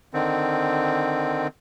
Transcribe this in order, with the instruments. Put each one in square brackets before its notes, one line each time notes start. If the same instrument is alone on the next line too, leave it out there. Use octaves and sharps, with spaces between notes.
[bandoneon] D3 D#3 C4